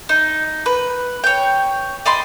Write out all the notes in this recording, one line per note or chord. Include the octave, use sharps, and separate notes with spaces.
D#4
B4
C#5 G5
D5 D#5 B5 C6